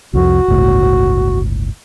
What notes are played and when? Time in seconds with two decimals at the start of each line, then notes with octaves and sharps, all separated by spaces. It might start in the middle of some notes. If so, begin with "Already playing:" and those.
0.13 C2 F2 C3 F#4
0.48 G1 C#2 A2